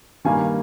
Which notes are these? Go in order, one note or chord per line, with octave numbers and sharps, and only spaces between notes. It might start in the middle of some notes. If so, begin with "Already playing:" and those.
G2 D#3 G3 A#3 G#5